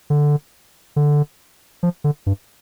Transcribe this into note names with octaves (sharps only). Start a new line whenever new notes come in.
D3
D3
F3
D3
G2